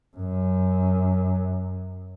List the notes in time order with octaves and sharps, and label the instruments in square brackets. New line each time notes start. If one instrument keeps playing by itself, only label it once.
[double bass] F#2